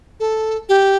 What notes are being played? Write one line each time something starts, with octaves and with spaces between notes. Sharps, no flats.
A4
G4